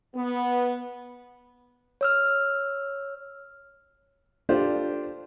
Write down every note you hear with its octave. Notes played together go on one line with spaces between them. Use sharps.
B3
C#5 E6 F6
D4 F4 G4 A4 C5